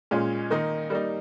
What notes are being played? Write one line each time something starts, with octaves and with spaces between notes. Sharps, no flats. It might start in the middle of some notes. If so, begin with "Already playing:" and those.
A#2 G#3 C#4 F4
D#3 A#3 D#4
G3 A#3 D#4